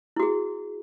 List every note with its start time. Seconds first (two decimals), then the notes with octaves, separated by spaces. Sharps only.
0.16 E4
0.20 F#4
0.23 G#4